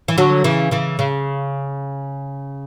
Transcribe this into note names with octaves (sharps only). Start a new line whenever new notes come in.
E3
D3 F#3
C#3 E3
C#3 E3
C#3